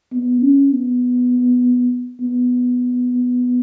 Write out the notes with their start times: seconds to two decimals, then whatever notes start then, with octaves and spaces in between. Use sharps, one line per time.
0.13 B3
0.43 C#4
0.73 B3
2.21 B3